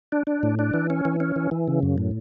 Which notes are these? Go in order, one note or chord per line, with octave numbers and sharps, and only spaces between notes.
D4
D4
A2
D4
E3
C#4
E3
C#4
E3
E3
C#3
F#2
A2